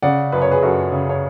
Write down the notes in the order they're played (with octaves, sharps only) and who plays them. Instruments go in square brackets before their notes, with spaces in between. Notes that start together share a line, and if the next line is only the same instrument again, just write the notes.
[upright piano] C#3 D5 F#5
F#2 B4
C#5
G#4 B4
F#2 F#4 A4
C#3
C#5